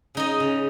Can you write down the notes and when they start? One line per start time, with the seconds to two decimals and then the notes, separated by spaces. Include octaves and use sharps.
0.15 C#3 D#4 D#5
0.40 C#3